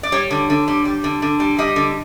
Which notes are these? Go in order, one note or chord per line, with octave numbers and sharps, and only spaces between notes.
D5
G3 C#5
D3
D3
G3
G3
D3
D3
G3
G3 D#5
D3